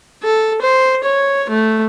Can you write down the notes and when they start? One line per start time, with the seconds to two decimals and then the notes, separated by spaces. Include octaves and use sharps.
0.23 A4
0.61 C5
1.04 C#5
1.49 A3